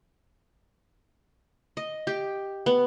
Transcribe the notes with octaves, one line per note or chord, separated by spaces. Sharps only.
D#5
G4
B3